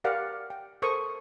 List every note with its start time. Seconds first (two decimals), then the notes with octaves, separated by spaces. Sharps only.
0.04 G4 A#4 D5 F5 F#5
0.50 G5
0.82 A4 A#4 C5 C#6 D#6